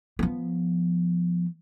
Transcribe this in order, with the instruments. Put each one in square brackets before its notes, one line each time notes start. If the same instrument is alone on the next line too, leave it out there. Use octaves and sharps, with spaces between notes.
[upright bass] F3 B3